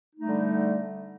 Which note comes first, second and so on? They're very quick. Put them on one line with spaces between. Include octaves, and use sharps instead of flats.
D#4 A3 G3 D3